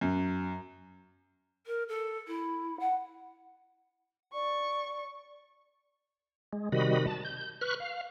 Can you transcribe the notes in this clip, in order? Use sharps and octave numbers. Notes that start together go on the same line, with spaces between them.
F#2
A#4
A4
E4
F#5
D5 C#6
G#3
C3 D#3 G3 F#4 D#5 B5
A5
G6
B4 C#6 F6 F#6
F5